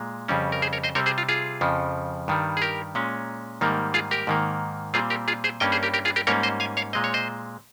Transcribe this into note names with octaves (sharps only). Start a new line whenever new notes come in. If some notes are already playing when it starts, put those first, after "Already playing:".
Already playing: A#2 G#3
F2 C#3 G3 C#4
A#4
G#4 C5
A#4 C#5
C5 D#5
C3 G3 C4 A#4 C#5
G#4 C5
F4
F4 G#4
F2 C#3 F3
G2 D#3 G3
G#4
G4 A#4
A#2 G#3 C#4
G#2 D#3 G3 A#3
F4 G#4
G4 A#4
G#2 D#3 A#3
A#2 G3 C4 F4 G#4
G4 A#4
F4 G#4
G#4 C5
G2 G3 A#3 C#4 D#5 G5
G#4 C5
G4 A#4
G4 A#4
F4 G#4
G4 A#4
G#2 G3 A#3 C#4 A#4 C#5
C5 D#5
F5 G#5
C#5 F5
A#2 G#3 C4 D#5
C#5
C5 D#5